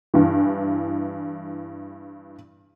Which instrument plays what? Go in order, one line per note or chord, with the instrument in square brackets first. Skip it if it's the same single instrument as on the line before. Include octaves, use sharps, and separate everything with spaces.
[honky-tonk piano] G2 E3